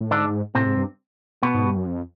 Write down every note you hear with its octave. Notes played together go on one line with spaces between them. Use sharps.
A2
G#2 D3 D4
A2 C3 C4
G#2
G2
B2 B3
G#2
G2
F#2
F2